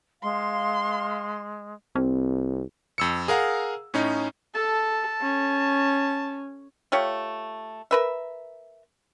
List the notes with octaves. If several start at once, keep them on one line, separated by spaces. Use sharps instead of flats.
G#3 F5 C6
C2 C4
F2 E6 C#7
G#4 A#4 F5 F#5 A#5
A2 C#4 D#4
A4 A5
C#4
A3 F4 G4 C#5
A#4 B4 E5